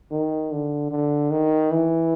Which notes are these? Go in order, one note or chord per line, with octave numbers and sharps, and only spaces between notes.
D#3
D3
D3
D#3
E3